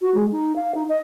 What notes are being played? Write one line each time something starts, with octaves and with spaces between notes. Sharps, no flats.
F#4
G#3
D#4
F5
D#4
D#5